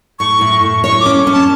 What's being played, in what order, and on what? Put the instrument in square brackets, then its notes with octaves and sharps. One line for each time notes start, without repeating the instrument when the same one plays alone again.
[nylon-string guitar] A2 [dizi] C#6
[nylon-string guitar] A2
A2
[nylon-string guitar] C#5 [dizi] C#6
[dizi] D6
[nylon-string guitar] C#4
C#4
[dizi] A5